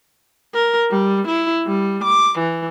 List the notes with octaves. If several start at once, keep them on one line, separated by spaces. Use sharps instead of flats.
A#4
G3
E4
G3
D6
E3